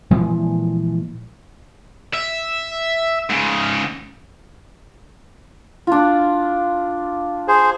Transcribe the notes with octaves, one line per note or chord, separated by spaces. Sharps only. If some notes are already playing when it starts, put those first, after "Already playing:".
A#2 E3 F3 G#3
E5
G#2 C#3
D4 F4
G#4 C5